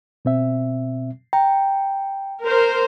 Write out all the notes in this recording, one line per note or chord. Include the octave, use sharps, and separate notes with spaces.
B2 C4 E5
G5 A#5
A#4 C5